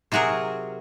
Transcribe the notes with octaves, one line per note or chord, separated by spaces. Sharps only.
C3 F#3 F#4 G#4 A#4